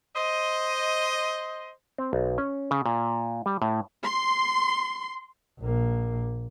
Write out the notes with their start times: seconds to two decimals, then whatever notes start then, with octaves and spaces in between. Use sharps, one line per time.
0.16 C5 D#5
1.98 C4
2.13 B1
2.38 C#4
2.71 C#3
2.86 A#2
3.46 G3
3.62 A2
4.05 C6
5.60 A#1 A#3